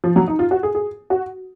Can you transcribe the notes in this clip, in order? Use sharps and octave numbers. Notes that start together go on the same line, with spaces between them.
F3
F#3
D#4
F4
F#4
G#4
G#4
F#4